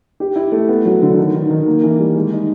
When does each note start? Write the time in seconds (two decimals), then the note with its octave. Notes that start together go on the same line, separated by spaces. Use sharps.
0.20 G4
0.36 E4
0.52 A3
0.69 B3
0.85 F#3
1.02 D3
1.18 D#3
1.34 D#3
1.50 D#3
1.67 A#3
1.83 E3
1.99 G3
2.15 G#3
2.32 D#4